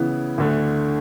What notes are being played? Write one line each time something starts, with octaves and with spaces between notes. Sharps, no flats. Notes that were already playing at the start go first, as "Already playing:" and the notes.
Already playing: C#3 E3 B3 E4
D2 D3 A3